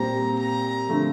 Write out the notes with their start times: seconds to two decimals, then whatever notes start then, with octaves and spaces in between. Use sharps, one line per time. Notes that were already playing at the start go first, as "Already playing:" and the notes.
Already playing: A#2 G3 C4 G4 A#5
0.39 A#5
0.88 D3 F3 A3 C4